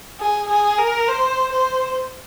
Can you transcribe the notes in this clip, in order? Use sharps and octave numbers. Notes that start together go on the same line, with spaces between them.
G#4
G#4
A#4
C5
C5